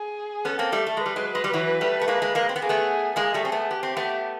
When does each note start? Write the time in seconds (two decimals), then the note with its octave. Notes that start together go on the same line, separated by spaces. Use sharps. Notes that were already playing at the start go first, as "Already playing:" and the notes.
Already playing: G#4
0.45 B3 C#4 A4
0.59 A#3 C4
0.72 G3 A3
0.86 A3
0.97 G#3 B4
1.06 G3
1.16 F#3 G#3
1.35 G#3
1.44 G3
1.53 E3 F#3
1.81 G3 A3
2.01 A3
2.08 G#3 A#3
2.22 G#3 A#3
2.35 G#3 A#3
2.49 C4
2.56 B3
2.62 A#3 G#4
2.69 A3 B3
3.16 G#3 A#3 G#4
3.34 G3 A3
3.45 C4
3.52 A3 B3
3.71 B3 G4
3.83 C4
3.97 A3 B3